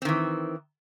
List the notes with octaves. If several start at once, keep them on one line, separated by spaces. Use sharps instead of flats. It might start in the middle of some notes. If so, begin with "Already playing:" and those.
D#3 E3 C4